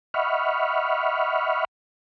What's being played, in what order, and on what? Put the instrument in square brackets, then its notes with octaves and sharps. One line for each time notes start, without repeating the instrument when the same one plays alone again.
[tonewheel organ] D#5 E5 F#5 B5 C#6 F6